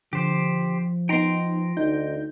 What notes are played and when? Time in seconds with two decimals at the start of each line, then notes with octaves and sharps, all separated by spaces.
0.13 D3 F3 G4 C5
1.09 B3 D#4 G5 A#5 C6
1.77 D2 D#4 G6